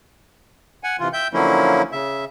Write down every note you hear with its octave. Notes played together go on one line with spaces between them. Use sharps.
F#5 G#5
C3 E3 F4
E5 G5 G6
D3 F3 F#3 A#3 C#4 E4
C#3 E5